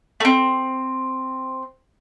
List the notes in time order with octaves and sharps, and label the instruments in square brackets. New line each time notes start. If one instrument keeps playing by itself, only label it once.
[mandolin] A3 C4